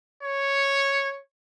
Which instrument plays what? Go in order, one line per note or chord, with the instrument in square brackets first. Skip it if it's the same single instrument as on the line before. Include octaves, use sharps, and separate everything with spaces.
[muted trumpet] C#5